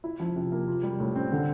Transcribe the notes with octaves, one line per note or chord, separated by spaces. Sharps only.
E4
F3
C3
A#3
F4
G3
A2
C4
D3